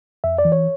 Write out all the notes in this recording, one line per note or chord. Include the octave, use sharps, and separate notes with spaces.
F2 E5
D5
E3
C#5